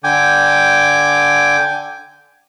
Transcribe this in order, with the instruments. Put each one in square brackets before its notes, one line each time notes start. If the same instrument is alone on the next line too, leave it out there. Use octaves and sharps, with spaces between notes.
[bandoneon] D3 G5 G#5 D6